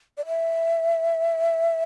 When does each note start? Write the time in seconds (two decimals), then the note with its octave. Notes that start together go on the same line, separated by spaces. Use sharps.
0.18 D5
0.26 E5